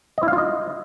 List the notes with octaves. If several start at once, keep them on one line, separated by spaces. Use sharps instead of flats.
D#5
E4
F5
F4
D#5